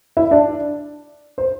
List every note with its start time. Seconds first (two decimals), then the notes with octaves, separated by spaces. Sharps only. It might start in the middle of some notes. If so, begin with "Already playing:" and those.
0.17 E4 E5
0.31 D4 D5
1.38 C5